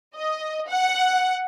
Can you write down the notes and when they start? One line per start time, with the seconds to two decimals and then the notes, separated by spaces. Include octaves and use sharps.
0.16 D#5
0.68 F#5